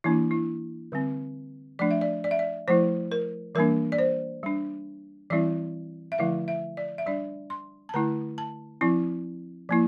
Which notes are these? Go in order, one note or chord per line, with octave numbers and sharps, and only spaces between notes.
E3 A#3 D4 E4
E4
D3 G3 C4
F3 A3 D4 D5
E5
D5
D5
E5
D5
F3 A3 E4 C5
A#4
E3 G3 A#3 D4 A#4
D5
C5
G3 D4
E3 G3 C4 E4 D5
E5
D3 F3 A3 E4 F5
E5
D5
E5
G3 D4 D5
C6
A5
D3 A3 E4 A#5
A5
F3 C4 E4
F3 A#3 E4